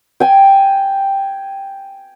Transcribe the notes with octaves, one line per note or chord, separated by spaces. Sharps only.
G5 G#5